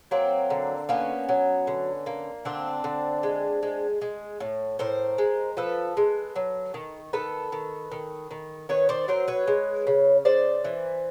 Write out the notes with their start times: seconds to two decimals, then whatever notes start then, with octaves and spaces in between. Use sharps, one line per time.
0.11 F#3 A#3 C4
0.50 D3
0.89 A#3 B3 C#4
1.29 F#3
1.67 D3
2.06 A#3
2.45 D3 C4 D4
2.84 D3
3.23 G#3
3.63 G#3
4.01 G#3
4.40 A2
4.79 A2 A#4 C5
5.18 G#3
5.57 F3 A4 B4
5.97 G#3
6.36 F#3
6.74 D#3
7.13 D#3 A4 B4
7.52 D#3
7.92 D#3
8.31 D#3
8.69 D#3 B4 C#5
8.89 C5 D5
9.08 F#3 A#4 C5
9.28 B4 C#5
9.47 G#3
9.87 C#3
10.25 C#3 C5 D5
10.64 E3